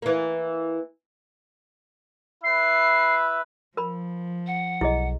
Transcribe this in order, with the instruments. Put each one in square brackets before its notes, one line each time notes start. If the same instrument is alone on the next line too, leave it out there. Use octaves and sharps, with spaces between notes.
[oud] E3 A#3
[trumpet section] E4 B4 E5 [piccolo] C7
[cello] F3 [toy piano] A#4 B5
[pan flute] F#5
[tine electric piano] B1 [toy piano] E4 G#4 D#5